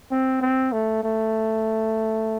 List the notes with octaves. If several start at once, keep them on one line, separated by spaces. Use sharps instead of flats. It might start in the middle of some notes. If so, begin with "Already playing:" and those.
C4
C4
A3
A3